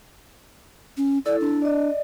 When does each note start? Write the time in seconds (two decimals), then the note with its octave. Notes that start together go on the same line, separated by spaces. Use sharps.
0.97 C#4
1.26 E4 A4 D5
1.41 D4
1.62 D5 D#5